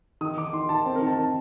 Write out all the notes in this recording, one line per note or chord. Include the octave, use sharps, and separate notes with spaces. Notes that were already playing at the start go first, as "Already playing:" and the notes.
D#3 D#6
D#3 D6
D#3 C6
D#3 A5
C4 G5
A#4
D#3
A5
D#3 A5